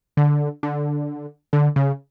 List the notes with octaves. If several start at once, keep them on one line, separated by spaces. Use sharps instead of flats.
D3
D3
D3
C#3